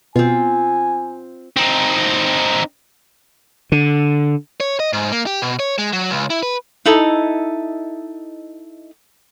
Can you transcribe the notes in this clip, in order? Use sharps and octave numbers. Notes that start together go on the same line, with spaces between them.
B2 C4 F4 G#5
C4 D#4
D3
C#5
D#5
G#2
A#3
G4
B2
C#5
G#3
F#3
C#2
E4
B4
D#4 E4 A4 D#5